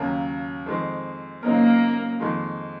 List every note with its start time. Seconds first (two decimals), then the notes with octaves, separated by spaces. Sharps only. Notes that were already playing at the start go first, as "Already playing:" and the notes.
Already playing: D#2 C#3 F#3 A#3
0.66 F2 D#3 G#3 C4
1.43 C#3 F#3 A#3 C4 D#4 A#4
2.20 F2 D#3 G#3